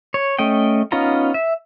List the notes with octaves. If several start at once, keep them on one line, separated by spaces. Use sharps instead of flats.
C#5
A3 C#4 D#5 G5
B3 C#4 D#4 F4 A#5
E5